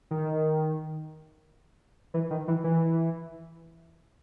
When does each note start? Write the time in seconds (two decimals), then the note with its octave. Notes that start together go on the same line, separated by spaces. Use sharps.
0.11 D#3
2.14 E3
2.30 D#3
2.48 E3
2.64 E3